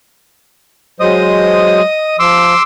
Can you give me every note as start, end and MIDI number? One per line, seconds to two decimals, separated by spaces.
1.00 1.81 54
1.00 1.81 56
1.00 1.81 72
1.00 2.17 75
1.00 2.17 87
2.19 2.54 53
2.19 2.62 84
2.19 2.62 86
2.19 2.62 88